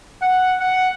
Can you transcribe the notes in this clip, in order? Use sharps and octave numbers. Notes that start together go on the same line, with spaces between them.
F#5
F#5